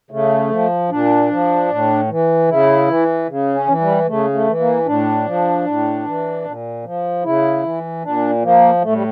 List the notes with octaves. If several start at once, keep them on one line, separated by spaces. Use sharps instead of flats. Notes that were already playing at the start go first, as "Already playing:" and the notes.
C#3 A3
F3
A#2 D4
F3
A2
E3
C#3 E4
E3
C#3
C#4
E3
G3
C#3 A3
A3
E3
A#3
A2 D4
F3
A2
E3
A#2
F3
C#3 E4
E3
A#2 D4
F3 A#3
A2 A3
G3